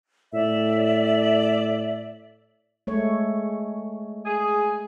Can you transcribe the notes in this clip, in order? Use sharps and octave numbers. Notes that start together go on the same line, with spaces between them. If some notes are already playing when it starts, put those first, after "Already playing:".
A2 D5 E5
G#3 A3 C#5
G#4